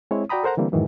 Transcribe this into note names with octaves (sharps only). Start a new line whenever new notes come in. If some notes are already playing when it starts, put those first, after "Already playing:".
G#3 C4 E4 C#5
F#4 D5 G5 A#5 B5 D#6
A4 A#4 C5 F#5 A#5
D3 E3 G3 A#3 C4
F2 G#2 D#3 E3 F#3